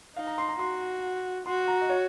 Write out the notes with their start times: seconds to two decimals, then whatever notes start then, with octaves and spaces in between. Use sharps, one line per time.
0.16 D#4 F5
0.27 A#5
0.38 C6
0.49 A#5
0.59 F#4 C6
1.46 F#4 C6
1.68 A#5
1.81 D#5
1.90 C#5